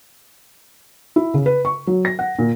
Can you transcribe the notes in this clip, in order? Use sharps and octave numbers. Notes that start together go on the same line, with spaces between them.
E4
C#3
B4
C#6
F#3
A#6
F#5
A#2